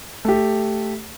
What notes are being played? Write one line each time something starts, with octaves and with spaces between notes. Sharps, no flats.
A3 G4